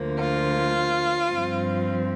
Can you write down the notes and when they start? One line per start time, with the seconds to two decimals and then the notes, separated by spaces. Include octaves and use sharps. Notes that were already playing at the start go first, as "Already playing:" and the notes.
Already playing: D2 D3 F3 A#3
0.18 F4
1.32 G2 F3 C4